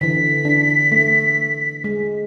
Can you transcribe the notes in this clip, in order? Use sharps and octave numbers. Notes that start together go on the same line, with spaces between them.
D3 E3 B6
D4
A3
G#3